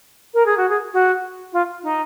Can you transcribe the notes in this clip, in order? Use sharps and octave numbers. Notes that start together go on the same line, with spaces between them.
A#4
G#4
F#4
G#4
F#4
F4
D#4